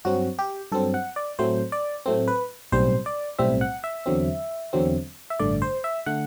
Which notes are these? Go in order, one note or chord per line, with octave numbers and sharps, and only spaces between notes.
G2 F#3 C4 F#4
G4
G2 F#3 C4 A4
F#5
D5
A2 F#3 A3 C4 C5
D5
A2 F#3 A3 C4
B4
B1 A2 G3 C4 C5
D5
B1 A2 G3 C4 E5
F#5
E5
E2 D3 F#3 C4
E2 D3 F#3 C4
E5
A1 G2 D3 A3 D5
C5
E5
D3 A3 F#5